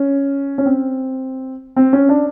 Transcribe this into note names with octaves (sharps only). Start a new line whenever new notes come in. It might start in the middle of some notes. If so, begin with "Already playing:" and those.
Already playing: C#4
C#4
C4
C4
C#4
D4